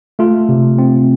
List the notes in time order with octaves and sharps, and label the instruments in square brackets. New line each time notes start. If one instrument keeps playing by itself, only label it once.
[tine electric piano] A3 F4
C3
C4